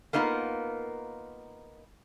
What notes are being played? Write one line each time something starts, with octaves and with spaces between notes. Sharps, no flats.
A#3 B3 D#4 F4 A#4